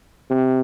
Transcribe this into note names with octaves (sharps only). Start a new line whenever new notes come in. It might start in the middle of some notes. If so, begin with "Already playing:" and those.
C3